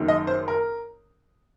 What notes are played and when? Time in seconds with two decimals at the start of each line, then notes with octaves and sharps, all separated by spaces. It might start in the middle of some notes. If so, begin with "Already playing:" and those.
Already playing: F#1 F#2 D#3
0.08 D#5
0.27 C5
0.48 A#4